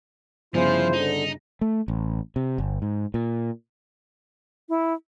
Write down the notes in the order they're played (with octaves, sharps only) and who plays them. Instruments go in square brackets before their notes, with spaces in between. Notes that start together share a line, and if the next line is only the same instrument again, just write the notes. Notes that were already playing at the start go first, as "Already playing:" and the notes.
[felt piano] G1 C#3 G#5 [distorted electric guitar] F3 [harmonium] E4 F4 [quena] C5
[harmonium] D3 [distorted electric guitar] D#4
[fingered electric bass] A3
A1
C3
G1
G#2
A#2
[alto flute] E4